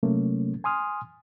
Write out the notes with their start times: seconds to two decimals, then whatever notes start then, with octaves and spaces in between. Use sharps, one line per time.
0.03 C3 F#3 A3 A#3 C#4
0.64 G#5 C6 D#6 F6